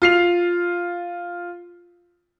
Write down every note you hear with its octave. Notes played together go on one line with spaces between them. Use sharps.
F4 C7 F7